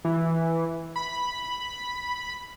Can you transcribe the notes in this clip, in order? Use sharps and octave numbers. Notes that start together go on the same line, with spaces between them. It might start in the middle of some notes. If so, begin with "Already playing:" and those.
E3
B5